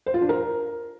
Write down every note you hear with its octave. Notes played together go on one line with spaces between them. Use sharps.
C5
F4
D4
A#4